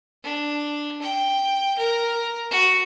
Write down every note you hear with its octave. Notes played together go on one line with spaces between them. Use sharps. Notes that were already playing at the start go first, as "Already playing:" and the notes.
D4
G5
A#4
F#4